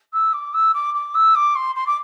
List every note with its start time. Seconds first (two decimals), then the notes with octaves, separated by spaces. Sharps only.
0.13 E6
0.33 D6
0.53 E6
0.74 D6
0.94 D6
1.14 E6
1.35 D6
1.55 C6
1.75 C6
1.86 D6